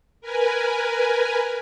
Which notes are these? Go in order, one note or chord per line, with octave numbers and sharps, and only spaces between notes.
A#4 B4 G#5